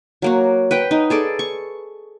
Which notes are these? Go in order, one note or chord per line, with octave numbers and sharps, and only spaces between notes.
F#3 A#3 F#4
B4 F#5 G5
D#4
G#4 A4 D5
C#6